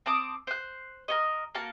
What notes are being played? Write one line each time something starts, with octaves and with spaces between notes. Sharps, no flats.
C4 A5 D6 D#6
C5 F#6
A#4 C#5 D#5
A#3 F#4 A5